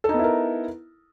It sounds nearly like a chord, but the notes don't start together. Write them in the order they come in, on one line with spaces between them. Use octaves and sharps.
A4 D#4 B3 E4 A#4